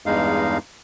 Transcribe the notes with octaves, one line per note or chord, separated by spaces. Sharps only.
E2 G2 G#3 D#4 F5